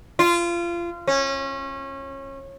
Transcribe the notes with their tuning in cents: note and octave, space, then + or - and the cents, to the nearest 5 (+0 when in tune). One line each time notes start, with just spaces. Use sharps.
F4 -25
C#4 -25